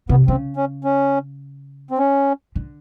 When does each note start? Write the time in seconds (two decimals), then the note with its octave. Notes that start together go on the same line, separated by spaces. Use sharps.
0.09 C3 B3
0.28 C#3 C4
0.57 C#4
0.84 C#4
1.91 C4
1.99 C#4
2.55 D3